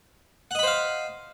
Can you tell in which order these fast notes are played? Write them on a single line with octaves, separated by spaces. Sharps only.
F#5 D#5 B5 C5 F5